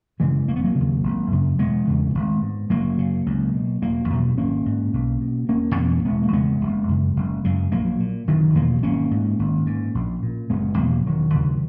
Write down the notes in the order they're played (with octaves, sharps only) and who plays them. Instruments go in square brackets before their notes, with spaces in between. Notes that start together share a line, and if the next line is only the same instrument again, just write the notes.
[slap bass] F#2 C#3 E3 G#3
E1 A#3
B3
F#3 A#3
C#3
D#2
G#1
F#2 C#3
E1 G#3 B3
E2 C#3
G#1
G#2
F#1 F#3 A#3
F#2 C#3
C#2
B2
E1 F#3 A#3
E2 B2
G#1 A#3 C#4
G#2
B1
B2
E1 A#3 C#4
E2 B2 A#3 C#4
E1 G#3 B3
A#3
E2 C#3 G#3 B3
F#1
F#2 C#3
F#1
F#2 C#3
A#1 F#3 A#3
A#2
F#1 D#3 F#3
E2 B2 F#3 A#3
G#1 A#3 C#4
G#2
G#1
G#2
A#1
A#2
F#1 G#3 B3
E2 B2 F#3 A#3
E1 D#3 F#3
D#2 C#3